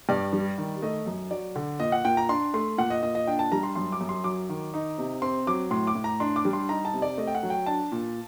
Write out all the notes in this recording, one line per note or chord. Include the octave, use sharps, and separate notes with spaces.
G2 D5
G3
D#3
A3 D#5
F#2
F#3 D5
D3
A#2 D#5
F#5
A#2 G5
A#5
D4 C6
A3 C6
A#2 F#5
D#5
A#2 D#5
D#5
D4 G5
A5
G3 A#5
C6
F#2 C6
D6
F#2
C6
F#3 D6
D#3
D#4
C3
C4 C6
F#3 D6
A2 C6
D6
A2
A#5
D4 C6
D6
G3
C6
D#4 A#5
A5
C3
D5
A3 D#5
G5
F#5
F#3
G5
D4 A5
A#2